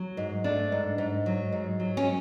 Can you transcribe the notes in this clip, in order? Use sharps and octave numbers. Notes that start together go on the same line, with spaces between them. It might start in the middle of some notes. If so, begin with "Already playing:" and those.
Already playing: F#3
G#2
A3 D4
G#2
G#2
F#3
G#2
F#3
C#4